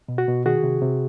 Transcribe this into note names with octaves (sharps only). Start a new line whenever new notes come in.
B2
F#4
B2
D#3 F#4 G#4
C3
C3